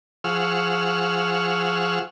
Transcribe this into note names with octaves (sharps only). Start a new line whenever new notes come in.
F3 G#4 F#5 C#6 E6 F6